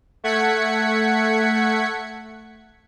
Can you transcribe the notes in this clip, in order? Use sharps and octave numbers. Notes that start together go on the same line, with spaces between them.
A3 F#5 G#6 B6 C#7